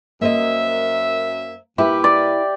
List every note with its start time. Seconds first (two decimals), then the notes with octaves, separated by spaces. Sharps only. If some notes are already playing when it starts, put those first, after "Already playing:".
0.21 F#2 A#3 C5 D#5 E5
1.78 A#2 E4 G4 A#4 B4
2.04 D5